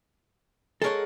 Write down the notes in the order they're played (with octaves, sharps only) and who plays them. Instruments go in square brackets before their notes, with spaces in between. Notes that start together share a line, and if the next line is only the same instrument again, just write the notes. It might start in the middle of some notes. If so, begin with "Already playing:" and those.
[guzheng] G#3 A#4 F#5 [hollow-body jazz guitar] A4 C#5